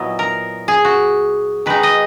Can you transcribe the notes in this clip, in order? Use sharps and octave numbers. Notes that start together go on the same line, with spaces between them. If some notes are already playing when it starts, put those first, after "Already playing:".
Already playing: A#2 F#3 B3 E4 D#5
A#4
G#4
F#4
D#3 G#3 D#4 B4
D#5